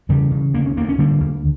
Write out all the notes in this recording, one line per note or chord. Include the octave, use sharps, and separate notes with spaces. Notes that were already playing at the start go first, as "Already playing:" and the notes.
C#3 E3 G3
C#3
D2 A#3
C#4
D2 A#3
C#4
D3 G3 A#3
D2